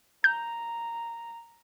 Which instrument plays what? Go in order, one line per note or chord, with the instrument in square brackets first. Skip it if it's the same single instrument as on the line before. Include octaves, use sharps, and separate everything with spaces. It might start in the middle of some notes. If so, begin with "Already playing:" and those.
[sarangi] A#5 [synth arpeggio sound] G6